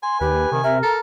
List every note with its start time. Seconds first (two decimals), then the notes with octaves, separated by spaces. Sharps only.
0.03 G#5 C6
0.21 D#2 G4 B4
0.52 C3 D#3
0.64 A#4 E5
0.83 A4 A#5